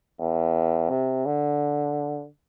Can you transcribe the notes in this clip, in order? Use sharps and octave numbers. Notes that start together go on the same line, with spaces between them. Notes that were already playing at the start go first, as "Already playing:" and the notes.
E2
C3
D3